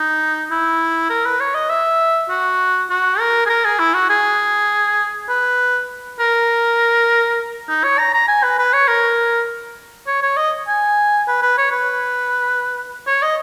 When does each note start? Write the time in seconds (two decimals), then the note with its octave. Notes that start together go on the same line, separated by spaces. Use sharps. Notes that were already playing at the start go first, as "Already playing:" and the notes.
Already playing: D#4
0.51 E4
1.10 A#4
1.26 B4
1.40 C#5
1.54 D#5
1.70 E5
2.29 F#4
2.90 F#4
3.19 A#4
3.46 G#4
3.49 A#4
3.65 G#4
3.79 E4
3.94 F#4
4.10 G#4
5.29 B4
6.19 A#4
7.68 D#4
7.84 C#5
7.99 A#5
8.14 A#5
8.28 G#5
8.43 B4
8.59 B4
8.73 C#5
8.88 A#4
10.07 C#5
10.23 C#5
10.37 D#5
10.68 G#5
11.28 B4
11.42 B4
11.58 C#5
11.72 B4
13.07 C#5
13.22 D#5